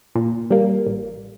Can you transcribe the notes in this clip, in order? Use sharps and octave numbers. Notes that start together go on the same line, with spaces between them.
A#2
G3 A#3
A1